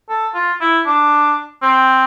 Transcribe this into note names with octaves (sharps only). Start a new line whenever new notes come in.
A4
F4
E4
D4
C4